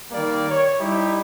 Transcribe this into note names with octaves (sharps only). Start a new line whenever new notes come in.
D#3 G3 A#3 D5 F5
C#5
G3 D#4 E4 G4